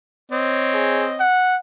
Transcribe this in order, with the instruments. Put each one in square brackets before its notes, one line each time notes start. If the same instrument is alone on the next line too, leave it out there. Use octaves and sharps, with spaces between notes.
[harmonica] C4 C#5 D#5
[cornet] G#4
F#5